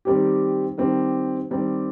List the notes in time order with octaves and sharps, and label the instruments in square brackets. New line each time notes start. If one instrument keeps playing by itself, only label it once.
[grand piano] D#3 G3 C4 G4
D#3 G3 C4 G4
D#3 G3 C4 G4